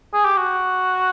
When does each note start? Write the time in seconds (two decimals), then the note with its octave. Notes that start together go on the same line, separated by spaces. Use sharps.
0.14 G#4
0.25 G4
0.37 F#4